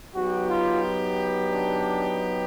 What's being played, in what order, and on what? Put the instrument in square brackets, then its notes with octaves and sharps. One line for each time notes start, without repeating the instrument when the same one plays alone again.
[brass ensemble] F#3 B3 D#4 G4 [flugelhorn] F#4
[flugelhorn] F4
D4